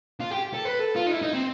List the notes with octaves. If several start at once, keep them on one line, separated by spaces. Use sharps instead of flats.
F4
G4
A4
B4
A4
F4
D#4
E4
D#4
C4